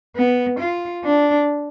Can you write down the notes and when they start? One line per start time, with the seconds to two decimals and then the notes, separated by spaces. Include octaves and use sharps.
0.16 B3
0.59 F4
1.04 D4